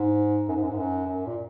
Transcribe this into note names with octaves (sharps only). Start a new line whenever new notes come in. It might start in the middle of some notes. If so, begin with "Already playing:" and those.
Already playing: G#2
F#2
G#2
F#2
G#2
F#2
F#2
A#2